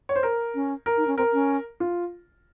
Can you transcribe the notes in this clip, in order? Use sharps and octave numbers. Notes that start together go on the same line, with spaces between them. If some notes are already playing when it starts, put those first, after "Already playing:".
C#5
C5
A#4
C#4
A#4
D#4
C#4
C4 A#4
C#4
F4